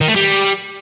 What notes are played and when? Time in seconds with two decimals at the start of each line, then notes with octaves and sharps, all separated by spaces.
0.01 D#3
0.08 A3
0.16 G3